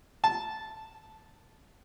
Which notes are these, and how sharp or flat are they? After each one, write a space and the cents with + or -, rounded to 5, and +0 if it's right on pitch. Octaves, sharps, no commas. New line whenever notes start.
A5 -10